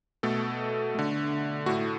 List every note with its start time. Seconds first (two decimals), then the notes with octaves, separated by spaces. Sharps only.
0.23 B2 A3 A4
0.95 D3 A3
1.66 A2 A3 F#4